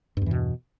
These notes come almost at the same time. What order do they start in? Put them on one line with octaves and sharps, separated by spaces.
G2 E2 E3 B2